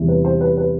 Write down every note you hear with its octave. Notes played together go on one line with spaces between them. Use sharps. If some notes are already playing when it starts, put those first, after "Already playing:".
Already playing: E2 C3 E3 G3
B4
C5
B4
B4